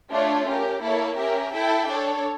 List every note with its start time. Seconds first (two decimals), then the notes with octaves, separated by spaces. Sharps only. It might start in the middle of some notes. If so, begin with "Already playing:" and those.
0.11 A3 D4 F4 A4 C#5
0.46 C#4 G4 A#4
0.81 A#3 E4 A4 C#5
1.17 C#4 G4 A#4 E5
1.52 E4 A4 E5 G5
1.88 D4 A4 C#5